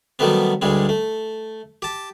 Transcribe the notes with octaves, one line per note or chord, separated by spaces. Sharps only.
D#3 F#3 G3 A3 B3 C4
D2 G2 G3 G#3 C4
A3
G4 A5